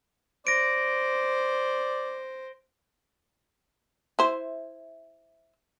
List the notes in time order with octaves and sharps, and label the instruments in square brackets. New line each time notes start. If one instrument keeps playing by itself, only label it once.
[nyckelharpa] C5 [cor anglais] D5 [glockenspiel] A#6 D7
[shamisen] E4 C5